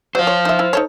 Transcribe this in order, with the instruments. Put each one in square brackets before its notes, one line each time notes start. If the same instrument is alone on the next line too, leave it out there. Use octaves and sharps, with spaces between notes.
[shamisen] F#3 [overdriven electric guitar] C5 F5
[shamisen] C#5
D#4 E5
E4
D#4 A4 C#5